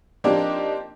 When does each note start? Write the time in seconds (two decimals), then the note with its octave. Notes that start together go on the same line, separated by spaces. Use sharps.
0.24 F3 A#3 C4 D4 D#4 G4